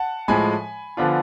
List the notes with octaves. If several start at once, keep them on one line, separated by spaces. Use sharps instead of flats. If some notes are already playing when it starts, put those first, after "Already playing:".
Already playing: F#5 A5
A2 F3 G#3 G#5 B5
D3 F3 B3 D4 F4